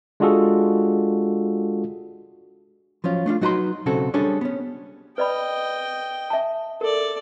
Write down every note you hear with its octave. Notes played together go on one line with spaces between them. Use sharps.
G#3 D4 F4 F#4 G#4 A4
F3 F#3 C#4 F4
A3 D4 D#4 F4
F#3 D#4 F#4 B4 A#5 C6
B1 C#3 C4 C#4 F#4 A4
G3 C#4 D4 G#4 A4
B3 C#4
B4 D5 D#5 G5 B5
E5 G#5 A5
A4 A#4 D5